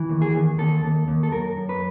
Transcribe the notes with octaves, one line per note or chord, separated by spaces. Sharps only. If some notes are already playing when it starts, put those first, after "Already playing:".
Already playing: E3
D#2
G#4
D#2
D#2 A4
D#2
D#2
A4
F#2 A#4
F#2
B4